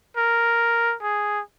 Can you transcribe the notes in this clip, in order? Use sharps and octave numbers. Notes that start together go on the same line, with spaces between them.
A#4
G#4